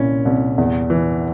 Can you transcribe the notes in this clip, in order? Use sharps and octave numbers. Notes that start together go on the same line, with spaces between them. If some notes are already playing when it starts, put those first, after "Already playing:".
Already playing: C2 A#2 C#4 E4
C2
E2
E3